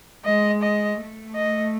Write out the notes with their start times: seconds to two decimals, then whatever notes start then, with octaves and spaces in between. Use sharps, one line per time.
0.25 G#3 D#5
0.62 D#5
0.99 A3
1.35 D#5